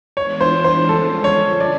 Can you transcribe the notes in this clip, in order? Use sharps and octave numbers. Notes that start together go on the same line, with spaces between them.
E3 G#3 B3 D4 F4 C#5
C5
C5
D3 F3 G#3 C#4 F4 A4
C#5
D5